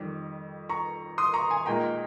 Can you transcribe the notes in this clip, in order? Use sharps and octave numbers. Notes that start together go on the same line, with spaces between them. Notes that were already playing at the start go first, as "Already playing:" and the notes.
Already playing: F2 D#3 G3
A#5 C#6
C6 D#6
A#5 C#6
G#5 C6
A#2 G#3 D#4 G5 A#5